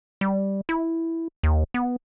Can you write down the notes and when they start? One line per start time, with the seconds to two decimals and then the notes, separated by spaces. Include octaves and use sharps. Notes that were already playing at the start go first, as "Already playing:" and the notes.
0.21 G3
0.69 E4
1.43 D#2
1.74 B3